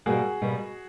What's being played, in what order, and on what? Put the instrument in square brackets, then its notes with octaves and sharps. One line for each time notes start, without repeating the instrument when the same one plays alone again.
[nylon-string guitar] B2 G3 A#3 [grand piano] F#4 G#4
[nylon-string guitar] B2 G3 A#3